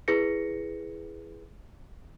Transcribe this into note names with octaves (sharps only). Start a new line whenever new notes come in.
E4 G#4 B4 A#6 C#7